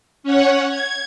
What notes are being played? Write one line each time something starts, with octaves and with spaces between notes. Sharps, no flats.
C#4 C#5 F#5
G#6